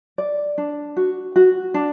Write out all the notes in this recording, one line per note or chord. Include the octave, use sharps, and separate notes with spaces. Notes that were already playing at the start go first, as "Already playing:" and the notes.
D5
D4
F#4
F#4
D4